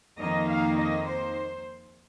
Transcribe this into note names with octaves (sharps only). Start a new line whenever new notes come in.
F2 D#3 A#3 D#4 D#5
F5
D#5
C5